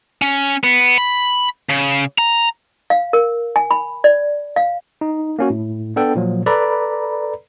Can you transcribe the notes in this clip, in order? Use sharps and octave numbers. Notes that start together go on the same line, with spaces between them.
C#4
B3
B5
C#3
A#5
F5
A#4
G#5
B5
D5
F5
D#4
A#3 C#4 F#4
A2
B3 D4 A4 G5
A#2 F3 F#3
A4 B4 D5 A#5 B5